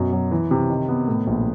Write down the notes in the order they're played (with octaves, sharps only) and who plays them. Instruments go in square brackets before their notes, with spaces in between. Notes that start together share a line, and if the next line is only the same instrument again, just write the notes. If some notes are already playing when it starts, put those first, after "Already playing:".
Already playing: [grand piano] F#2 B2
F#3
E3
C3
D#3
B3
A2
A#1